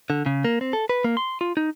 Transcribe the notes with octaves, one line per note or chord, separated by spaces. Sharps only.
D3
C#3
A#3
C4
A4
B4
A#3
C6
F4
D#4